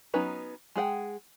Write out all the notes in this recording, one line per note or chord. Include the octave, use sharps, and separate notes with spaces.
F#3 B3 C#4 D#4 B4
G#3 G#4 F#5 G5